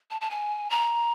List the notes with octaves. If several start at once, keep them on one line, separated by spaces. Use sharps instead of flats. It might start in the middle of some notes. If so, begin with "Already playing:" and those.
A5
A5
G#5
A#5